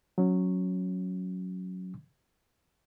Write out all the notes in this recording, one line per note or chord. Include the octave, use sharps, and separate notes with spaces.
F#3 C#4